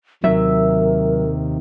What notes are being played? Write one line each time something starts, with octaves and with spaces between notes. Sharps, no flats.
D#2 C3 D#3 F#3 A#4 E5